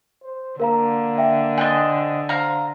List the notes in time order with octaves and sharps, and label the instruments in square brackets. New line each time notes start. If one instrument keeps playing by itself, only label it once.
[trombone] C5
[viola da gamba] D3 [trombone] A#3 [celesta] A#4 F5 A#5
[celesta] E5 G5
[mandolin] C4 D#5 [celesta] G#5 F#6 A6
[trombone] C5 [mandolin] F5 A#5